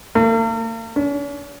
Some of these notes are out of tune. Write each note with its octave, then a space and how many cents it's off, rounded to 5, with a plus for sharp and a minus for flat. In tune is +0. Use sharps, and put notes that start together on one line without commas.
A#3 -45
C#4 +45